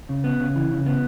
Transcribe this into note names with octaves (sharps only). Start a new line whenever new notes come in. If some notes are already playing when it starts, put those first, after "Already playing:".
C#3
B3
C#3
E3
C#3
B3